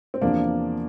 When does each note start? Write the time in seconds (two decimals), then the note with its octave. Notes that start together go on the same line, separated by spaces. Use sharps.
0.14 C4
0.22 E2 C3 F3 A#3 D4